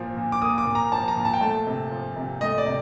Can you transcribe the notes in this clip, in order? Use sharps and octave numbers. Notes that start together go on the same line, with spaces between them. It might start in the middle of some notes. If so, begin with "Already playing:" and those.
Already playing: A#2 F3 A#3
A#2
D6
A#3 D#6
D6
A#2
A#5
F3 A5
A#5
A#2
A5
G5
A3 A5
C3
F3
C3
A3 D#5
D5
C3